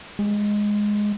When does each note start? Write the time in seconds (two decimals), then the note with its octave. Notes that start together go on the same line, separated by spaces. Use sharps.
0.19 G#3